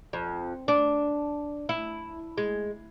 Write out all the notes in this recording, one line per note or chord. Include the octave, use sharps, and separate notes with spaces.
F2
D4
E4
G#3